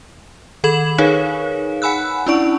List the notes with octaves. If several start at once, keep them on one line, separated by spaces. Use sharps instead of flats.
D#3 A4 B5 G#6 E7 F#7
D#4 G#4 A#4 B4 C#5 F5
F#5 G#5 B5 E6 F#6
C#4 D4 E4 D5 C#6 D7